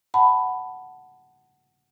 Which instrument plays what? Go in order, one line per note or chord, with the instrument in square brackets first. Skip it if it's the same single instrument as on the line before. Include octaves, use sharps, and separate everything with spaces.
[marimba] F#5 A5 B5